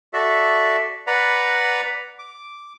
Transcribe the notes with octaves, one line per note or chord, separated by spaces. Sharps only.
F#4 A4 D5 E5
B4 D5 F#5 A#5 B5
D6